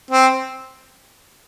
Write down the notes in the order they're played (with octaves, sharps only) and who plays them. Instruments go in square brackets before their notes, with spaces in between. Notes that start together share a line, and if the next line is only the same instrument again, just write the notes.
[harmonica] C4